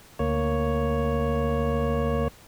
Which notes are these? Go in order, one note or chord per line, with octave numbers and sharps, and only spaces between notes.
D2 A#3 C#5